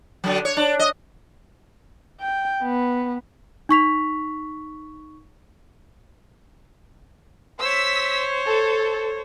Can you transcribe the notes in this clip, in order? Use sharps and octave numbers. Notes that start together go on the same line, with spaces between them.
D3 F#3
C#5
D4
D#5
G5
B3
D#4 C#6 B6 F7
C5 C#5 E6 B6
A4